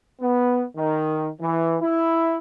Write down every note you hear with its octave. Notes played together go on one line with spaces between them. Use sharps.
B3
D#3
E3
E4